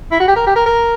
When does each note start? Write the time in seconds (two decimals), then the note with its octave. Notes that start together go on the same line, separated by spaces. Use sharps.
0.12 E4
0.20 F#4
0.28 G4
0.36 A#4
0.46 G4
0.56 A#4
0.66 A#4